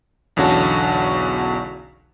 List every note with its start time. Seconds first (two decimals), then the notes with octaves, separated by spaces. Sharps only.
0.36 B1 E2 D3 C#4 F#4 A5